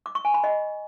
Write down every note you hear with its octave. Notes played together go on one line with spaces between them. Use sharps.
D6
C#6
G#5
B5
D#5